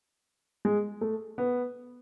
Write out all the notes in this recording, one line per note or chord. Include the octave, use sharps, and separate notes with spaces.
G#3
A3
B3